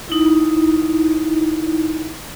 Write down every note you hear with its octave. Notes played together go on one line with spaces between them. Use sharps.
D#4 E4